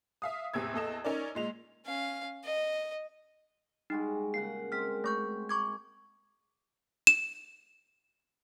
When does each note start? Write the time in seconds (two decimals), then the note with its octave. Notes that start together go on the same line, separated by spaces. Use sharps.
0.22 E5 F5 D#6
0.54 A1 E2 C3 E6 G#6
0.74 E2 A4 D#5 E7
1.04 C#4 D#4 A#4 D5
1.35 A#2 G#3 F7
1.86 C#4 F5
2.44 D#5
3.90 G3 G#3 D#4 F#4
4.34 A#2 C#3 F#5 C7
4.72 G#3 C4 A#4 F6 B6
5.04 A3 C#6 G6
5.49 C#6 D6 G#6
7.07 E7